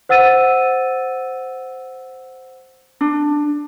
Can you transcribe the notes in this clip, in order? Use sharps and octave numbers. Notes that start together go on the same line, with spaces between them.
C5 F#5 E6 A6 D#7
D4